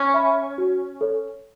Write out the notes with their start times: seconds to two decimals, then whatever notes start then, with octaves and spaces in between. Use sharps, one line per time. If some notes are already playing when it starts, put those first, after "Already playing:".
Already playing: C#4
0.14 E5 B5
0.58 F#4
1.01 A4 C#5